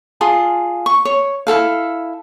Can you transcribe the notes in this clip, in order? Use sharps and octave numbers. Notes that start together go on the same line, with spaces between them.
F4 G#4 A5
C#6
C#5
E4 F4 A4 F5